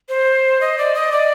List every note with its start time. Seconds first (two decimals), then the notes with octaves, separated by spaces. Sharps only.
0.09 C5
0.61 D#5
0.78 D5
0.94 D#5
1.12 D5